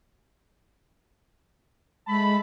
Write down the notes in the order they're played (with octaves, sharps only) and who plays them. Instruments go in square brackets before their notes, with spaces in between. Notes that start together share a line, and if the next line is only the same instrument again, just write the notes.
[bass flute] G#3 [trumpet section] A3 A5 B5